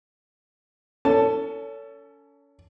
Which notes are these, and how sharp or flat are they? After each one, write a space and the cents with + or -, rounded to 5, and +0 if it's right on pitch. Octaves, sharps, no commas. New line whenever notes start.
C#4 +30 A4 +25 A5 +0